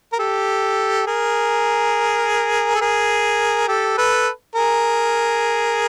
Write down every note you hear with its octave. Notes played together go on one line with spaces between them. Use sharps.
A#4
G4 A4
G#4 A#4
A4
G#4 A#4
G4 A4
A4 B4
G#4 A#4